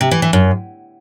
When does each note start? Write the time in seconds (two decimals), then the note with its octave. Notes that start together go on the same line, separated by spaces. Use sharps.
0.01 C3
0.11 E3
0.22 E3
0.33 F#2